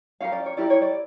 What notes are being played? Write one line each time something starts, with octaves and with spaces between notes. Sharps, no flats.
C#4 G4 A#4 F5
D5
C#5
E4 G4 A#4 D5
C#5
D5